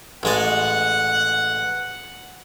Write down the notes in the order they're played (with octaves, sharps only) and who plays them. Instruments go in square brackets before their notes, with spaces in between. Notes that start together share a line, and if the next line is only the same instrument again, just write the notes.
[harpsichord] A1 G#3 D5 [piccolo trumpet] F#5